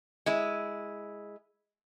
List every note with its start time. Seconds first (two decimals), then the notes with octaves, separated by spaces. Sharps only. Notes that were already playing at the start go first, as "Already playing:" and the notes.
0.26 G#3 E4